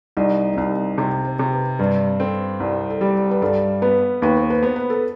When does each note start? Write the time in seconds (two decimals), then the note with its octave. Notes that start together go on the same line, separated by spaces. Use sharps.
0.17 C2 D#4
0.53 C4
0.57 C2 D#4
0.98 C3 C5
1.25 C5
1.39 C3
1.53 B4
1.79 G2 B4
2.19 C4 A4
2.60 C2
2.90 A4
3.01 G3 G4
3.31 B4
3.42 G2 A4
3.82 B3 B4
4.22 D#2 B4
4.37 C5
4.50 B4
4.63 B3 C5
4.76 B4
4.90 A4